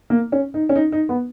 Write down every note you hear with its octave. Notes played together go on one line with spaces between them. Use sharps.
A#3
C#4
D#4
C#4
D#4
D#4
B3